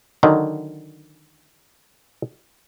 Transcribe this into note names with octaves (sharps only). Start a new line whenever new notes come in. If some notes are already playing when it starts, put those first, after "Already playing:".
D3 D#3 F#3